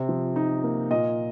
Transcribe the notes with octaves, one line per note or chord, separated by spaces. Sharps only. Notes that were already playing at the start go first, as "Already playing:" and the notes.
Already playing: C3 C4
F3
D#4
A#3
A#2 D#5